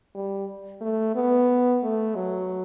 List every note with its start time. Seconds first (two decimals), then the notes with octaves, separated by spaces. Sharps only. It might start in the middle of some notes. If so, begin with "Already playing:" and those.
0.15 G3
0.81 A3
1.15 B3
1.83 A3
2.15 F#3